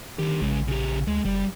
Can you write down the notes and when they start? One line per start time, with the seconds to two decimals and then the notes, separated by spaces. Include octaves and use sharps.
0.19 D3 D#3 G4
0.41 A#1 C#3 G#3
0.68 C#3 G4
1.08 D2 G#3
1.25 F#1 G3